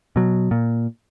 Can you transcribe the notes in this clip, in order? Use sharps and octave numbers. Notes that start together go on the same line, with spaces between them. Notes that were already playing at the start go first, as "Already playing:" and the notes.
B2 F#3
A#2